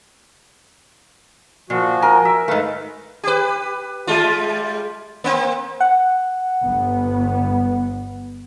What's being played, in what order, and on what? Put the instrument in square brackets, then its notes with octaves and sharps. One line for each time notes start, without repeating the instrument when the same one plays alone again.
[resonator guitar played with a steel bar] A#2 [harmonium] F3 F#4
[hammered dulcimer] A#4 [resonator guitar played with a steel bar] G#5
[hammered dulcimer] E5
[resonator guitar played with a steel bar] G#2 A3 [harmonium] B4 F5
[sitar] G4 B4
G3 G#3 F4
A#3 C4
[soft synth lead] F#5
[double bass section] G1 B3